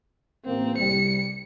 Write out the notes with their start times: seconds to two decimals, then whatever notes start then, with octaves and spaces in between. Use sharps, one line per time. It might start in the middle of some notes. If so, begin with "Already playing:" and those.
0.46 A1 A#3 C4
0.77 C2 G3 C#7